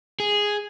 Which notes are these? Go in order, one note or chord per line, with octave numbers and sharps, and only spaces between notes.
G#4